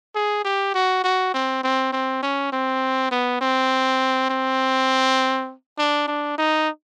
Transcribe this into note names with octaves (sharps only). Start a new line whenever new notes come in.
G#4
G4
F#4
F#4
C4
C4
C4
C#4
C4
B3
C4
C4
D4
D4
D#4